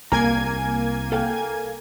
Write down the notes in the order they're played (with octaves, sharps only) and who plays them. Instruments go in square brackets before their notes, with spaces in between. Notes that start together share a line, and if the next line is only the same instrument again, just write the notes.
[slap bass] C2 [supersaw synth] A#3 G#5 G#6 [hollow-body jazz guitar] A#4 A#5
[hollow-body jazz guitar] A4 F5 G5